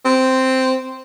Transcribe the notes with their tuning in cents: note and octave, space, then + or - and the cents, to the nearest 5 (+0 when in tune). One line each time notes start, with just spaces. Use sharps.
C4 -5